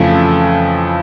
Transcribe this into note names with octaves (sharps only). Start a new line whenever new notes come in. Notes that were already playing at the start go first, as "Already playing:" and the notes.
Already playing: F2 C#3 E3 A3